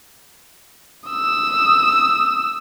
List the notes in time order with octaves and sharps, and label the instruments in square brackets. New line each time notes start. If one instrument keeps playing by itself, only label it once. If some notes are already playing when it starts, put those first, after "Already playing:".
[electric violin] D#6 E6